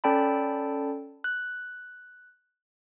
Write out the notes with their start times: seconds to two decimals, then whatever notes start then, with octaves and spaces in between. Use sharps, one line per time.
0.04 C#4 A4 D5 G5 A5 B5
1.24 F#6